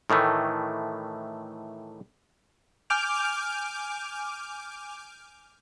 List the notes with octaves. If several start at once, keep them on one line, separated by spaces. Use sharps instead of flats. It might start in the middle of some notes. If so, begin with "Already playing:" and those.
A2 D#3 E3 A3
G#5 D6 F6 G6 D7 F7